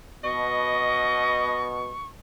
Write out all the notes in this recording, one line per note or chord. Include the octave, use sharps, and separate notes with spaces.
B2 D#5 C#6